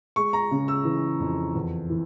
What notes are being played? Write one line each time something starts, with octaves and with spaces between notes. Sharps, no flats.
G#3 C#6
A#5
C#3
E6
E3
F2
E2
E3